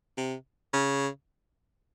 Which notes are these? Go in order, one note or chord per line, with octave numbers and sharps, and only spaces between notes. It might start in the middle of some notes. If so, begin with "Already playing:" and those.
C3
C#3